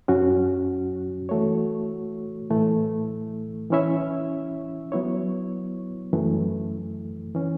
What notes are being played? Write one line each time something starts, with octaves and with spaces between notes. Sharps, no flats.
F#2 F#3 C#4 F#4
E3 A3 F#4 C#5
A2 E3 A3
E3 C#4 E4 C#5 E5
F#3 B3 E4 C#5
F#2 E3 A3
E3 C#4